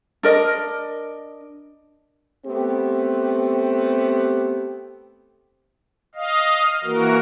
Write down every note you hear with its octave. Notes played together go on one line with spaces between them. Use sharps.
D4 A#4 D#5
A3 B3 C4 G4
D#5 F5
E3 A#3 F#4 A#4